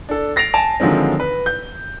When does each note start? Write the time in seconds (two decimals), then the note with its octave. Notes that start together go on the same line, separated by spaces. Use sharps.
0.09 D4 A4
0.36 A6 A#6 C7 D7 F7
0.54 G#5 A5 D7 F7
0.80 D3 D#3 F3 F#3 G#3 C4
1.20 B4
1.46 G6